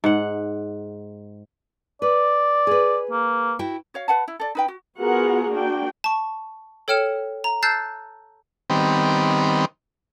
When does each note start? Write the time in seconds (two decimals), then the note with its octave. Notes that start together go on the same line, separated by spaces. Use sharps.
0.04 G#2 F#5
2.02 B4 D5
2.67 G#4 B4
3.11 A#3
3.59 E4 F#4 G5
3.94 F#4 C#5 F5
4.08 B4 F#5 A5
4.28 E4
4.40 A4 D5
4.55 D#4 B4 G5
4.68 F#4
5.00 B3 F4 F#4 G#4 A#4 F#5
5.50 A#3 D4 F#4 G5
6.04 A5 C#6
6.88 A4 C#5 G5 F6 C#7 E7
7.44 A#5
7.63 A5 E6 F#6 G6 A6 C7
8.70 D#3 G3 B3 C4